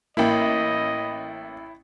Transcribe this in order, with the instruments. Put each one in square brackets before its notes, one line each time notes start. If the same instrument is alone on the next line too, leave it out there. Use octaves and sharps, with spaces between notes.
[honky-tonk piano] A1 E5 B5 [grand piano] A#3 [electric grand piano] E4 G5 [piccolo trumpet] D#5